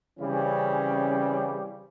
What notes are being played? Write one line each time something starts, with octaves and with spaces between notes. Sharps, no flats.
C#3 E3 G3 C4 C#4